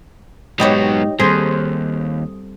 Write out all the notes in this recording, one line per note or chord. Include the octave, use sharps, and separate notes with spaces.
G#2 F#3 B3 D#4 G4 C#5
D#2 G#2 G3 C4 G#4 A4 C5